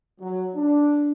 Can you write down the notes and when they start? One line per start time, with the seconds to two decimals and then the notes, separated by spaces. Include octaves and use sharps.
0.21 F#3
0.55 D4